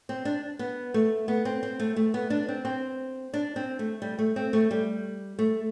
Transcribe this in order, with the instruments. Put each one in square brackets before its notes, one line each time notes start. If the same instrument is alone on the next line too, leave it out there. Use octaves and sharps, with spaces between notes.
[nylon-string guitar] C4
D4
B3
A3
B3
C4
C4
A3
A3
B3
D4
C4
C4
D4
C4
A3
G3
A3
C4
A3
G3
A3